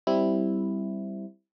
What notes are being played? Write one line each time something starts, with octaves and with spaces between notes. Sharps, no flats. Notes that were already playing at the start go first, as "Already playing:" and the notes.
G3 C4 E4